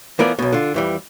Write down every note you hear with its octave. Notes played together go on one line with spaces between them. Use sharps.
E3 F3 B3 A#4 D5
B1 B2
D3 F4
F2 E3 G3